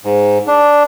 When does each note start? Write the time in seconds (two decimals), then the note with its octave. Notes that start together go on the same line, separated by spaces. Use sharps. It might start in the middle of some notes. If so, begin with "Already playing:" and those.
0.05 G#2
0.47 D4